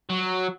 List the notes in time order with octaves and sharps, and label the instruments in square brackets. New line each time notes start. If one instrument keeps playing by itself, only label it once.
[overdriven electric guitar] F#3